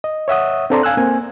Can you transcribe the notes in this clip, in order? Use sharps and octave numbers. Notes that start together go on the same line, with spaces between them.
D#5
C#5 E5 F#5 D#6
C4 D4 A4 D5 A#5 C6
F5 G#5 E6 F#6
A#3 C4 G#5